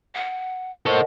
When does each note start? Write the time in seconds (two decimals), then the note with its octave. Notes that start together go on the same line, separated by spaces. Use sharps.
0.15 F#5
0.86 A4 A#4 C5 C#5 D#5 F#5